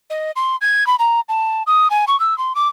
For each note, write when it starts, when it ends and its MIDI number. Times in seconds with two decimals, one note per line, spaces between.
0.10 0.31 75
0.36 0.56 84
0.61 0.86 92
0.87 0.96 83
0.99 1.20 82
1.29 1.63 81
1.67 1.88 87
1.90 2.05 80
2.08 2.18 85
2.20 2.37 88
2.38 2.53 84
2.55 2.68 86